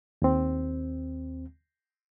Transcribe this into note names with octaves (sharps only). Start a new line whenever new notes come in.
D#2 C4